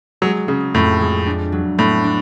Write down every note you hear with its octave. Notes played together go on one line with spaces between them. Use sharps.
F#3 G#3
C#3 G#3
F2 A2
G#3
D4
F#3
A2 B3
D4